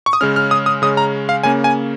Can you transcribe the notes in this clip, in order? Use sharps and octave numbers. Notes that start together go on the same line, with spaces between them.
C#6
D#6
C#3 G#3 C#4 F6
F6
D#6
D#6
C#3 G#3 C#4 D#6
A#5
F5
C#3 A#3 C#4 G#5
G#5